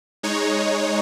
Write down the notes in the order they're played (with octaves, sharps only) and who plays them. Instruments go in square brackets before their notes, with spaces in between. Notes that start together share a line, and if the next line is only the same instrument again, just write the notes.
[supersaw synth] G#3 D#4 C#5